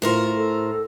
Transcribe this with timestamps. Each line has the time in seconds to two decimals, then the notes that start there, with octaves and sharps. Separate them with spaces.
0.02 A2 F4 A#4 C5
0.36 A4